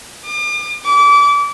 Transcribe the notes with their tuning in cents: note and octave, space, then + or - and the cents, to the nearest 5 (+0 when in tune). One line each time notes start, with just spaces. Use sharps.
D6 +45
D6 -30